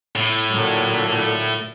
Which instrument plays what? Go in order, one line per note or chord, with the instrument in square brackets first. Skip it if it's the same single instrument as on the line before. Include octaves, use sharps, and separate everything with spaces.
[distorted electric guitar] A2
[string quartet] A#2 D3 F#3